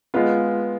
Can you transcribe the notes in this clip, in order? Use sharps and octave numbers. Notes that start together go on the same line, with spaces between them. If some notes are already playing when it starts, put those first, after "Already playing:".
G#3 B3 F4